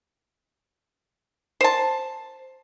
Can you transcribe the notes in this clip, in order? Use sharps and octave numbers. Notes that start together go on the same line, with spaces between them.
C5 A5